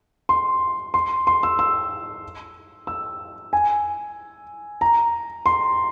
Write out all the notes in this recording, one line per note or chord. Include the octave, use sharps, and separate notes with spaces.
C6
C6
C6
E6
E6
E6
G#5
A#5
C6